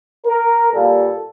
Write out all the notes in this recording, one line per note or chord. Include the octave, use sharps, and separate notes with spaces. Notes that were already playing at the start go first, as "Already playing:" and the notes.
A#4
A#2 G3 A#3 A4